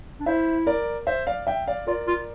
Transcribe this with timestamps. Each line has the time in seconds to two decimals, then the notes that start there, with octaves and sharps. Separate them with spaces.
0.20 D4
0.26 E4 C5 E5
0.67 A#4 D5
1.07 C5 E5
1.27 D5 F5
1.47 E5 G5
1.67 D5 F5
1.87 F4 A#4 D5
2.07 F4